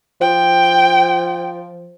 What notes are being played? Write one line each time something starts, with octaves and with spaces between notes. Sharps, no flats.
F3 G5